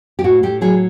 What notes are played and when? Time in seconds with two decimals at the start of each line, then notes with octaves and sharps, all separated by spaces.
0.19 G4
0.24 A2 F#4
0.43 A2 G4
0.61 F#3 G#4